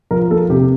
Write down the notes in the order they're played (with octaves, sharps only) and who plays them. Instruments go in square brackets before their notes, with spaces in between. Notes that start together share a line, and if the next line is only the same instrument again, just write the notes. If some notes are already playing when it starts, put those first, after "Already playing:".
[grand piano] F3 A#4
A#3 A4
C3 G4